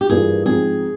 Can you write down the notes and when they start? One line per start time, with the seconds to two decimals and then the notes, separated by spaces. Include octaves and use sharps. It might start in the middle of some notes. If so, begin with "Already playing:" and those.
0.01 G4
0.10 G2 E3 A#3 F4 G#4
0.46 G#2 F3 C4 G#4